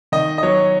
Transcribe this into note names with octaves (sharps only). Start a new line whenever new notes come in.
D#3 D#5
D#5
F#3 C#5